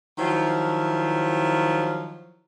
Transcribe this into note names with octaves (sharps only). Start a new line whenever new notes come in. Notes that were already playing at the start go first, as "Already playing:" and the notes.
D#3 F3 F#3 E4